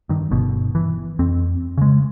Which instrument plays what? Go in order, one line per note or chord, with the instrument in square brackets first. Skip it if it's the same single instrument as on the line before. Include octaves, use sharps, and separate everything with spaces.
[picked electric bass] G2 D#3
G1 B2
E3
F2 C4
C#3 G#3